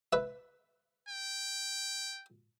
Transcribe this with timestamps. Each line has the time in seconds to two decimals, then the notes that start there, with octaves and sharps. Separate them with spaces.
0.13 B4 E5
1.09 G5